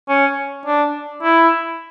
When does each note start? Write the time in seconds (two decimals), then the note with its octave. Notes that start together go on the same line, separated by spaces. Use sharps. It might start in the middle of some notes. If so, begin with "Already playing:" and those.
0.09 C#4
0.66 D4
1.23 E4